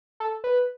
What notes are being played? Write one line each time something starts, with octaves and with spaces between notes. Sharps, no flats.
A4
B4